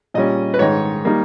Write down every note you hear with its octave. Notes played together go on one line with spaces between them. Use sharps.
A#2 G3 C#4 D#5
B4
G#2 D#3 G#3 D#4 C#5
G3 A#3 D#4